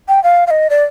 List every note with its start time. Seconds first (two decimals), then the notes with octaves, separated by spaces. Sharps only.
0.08 G5
0.24 F5
0.47 F5
0.51 D#5
0.70 D5